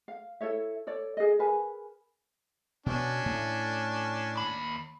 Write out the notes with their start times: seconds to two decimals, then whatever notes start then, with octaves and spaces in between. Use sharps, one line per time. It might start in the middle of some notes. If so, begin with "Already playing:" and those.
0.08 F5
0.41 E4 A4 C#5 E5
0.87 A4 C#5 D5
1.17 G#4 D#5
1.39 G#4 A#4 B4 G#5
2.86 B2 B3 C#4 D4
3.26 A2
4.37 D#2 B5